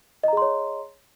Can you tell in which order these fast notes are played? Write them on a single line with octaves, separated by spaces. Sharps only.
D#5 A#5 G#4 C6 C#5